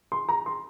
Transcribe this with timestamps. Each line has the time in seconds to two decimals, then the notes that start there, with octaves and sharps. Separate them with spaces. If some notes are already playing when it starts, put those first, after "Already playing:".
0.12 C6
0.29 A#5
0.46 C6